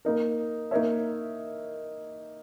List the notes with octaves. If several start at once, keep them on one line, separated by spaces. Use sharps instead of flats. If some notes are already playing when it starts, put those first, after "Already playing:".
A#3 D#4 A#4
A#3 D#4 A#4 C#5 E5